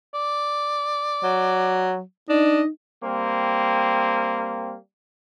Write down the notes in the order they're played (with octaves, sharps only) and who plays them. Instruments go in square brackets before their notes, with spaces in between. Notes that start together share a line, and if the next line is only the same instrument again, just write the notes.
[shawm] D5
[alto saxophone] F#3
[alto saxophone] D4 [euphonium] D#4 [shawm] D#5
[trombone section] G3 A#3 C4